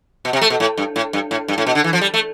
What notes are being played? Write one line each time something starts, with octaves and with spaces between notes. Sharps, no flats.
B2
C3
A3
B2
A2
G2
A2
G2
A2
G2
A2
B2
D3
E3
F3
G3
A3